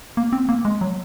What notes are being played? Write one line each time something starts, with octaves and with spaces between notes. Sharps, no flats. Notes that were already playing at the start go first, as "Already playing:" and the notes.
A#3
C4
A#3
G#3
F#3